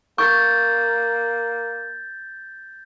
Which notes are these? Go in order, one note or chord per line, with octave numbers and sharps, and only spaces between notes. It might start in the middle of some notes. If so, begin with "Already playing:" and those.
A#3 C#6 G6 A6